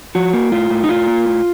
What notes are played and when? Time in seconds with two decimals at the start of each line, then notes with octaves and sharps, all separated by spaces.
0.15 F3 F#4
0.33 A#3
0.52 A2 F4
0.70 A2
0.84 D#4
0.89 A2 F4
1.07 A#3
1.26 A2